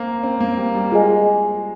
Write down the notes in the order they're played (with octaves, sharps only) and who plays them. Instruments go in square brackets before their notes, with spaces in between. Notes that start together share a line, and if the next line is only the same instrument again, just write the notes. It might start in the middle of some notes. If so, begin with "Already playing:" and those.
Already playing: [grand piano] A#3 C4
C4
A#3
G3
G3
[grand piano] G#3 [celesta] F4 G#4 D#5 G#5